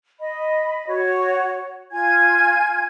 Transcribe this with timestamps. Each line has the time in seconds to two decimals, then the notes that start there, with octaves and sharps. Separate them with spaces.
0.20 D#5 B5
0.87 F#4 C#5
1.91 F4 G#5 G#6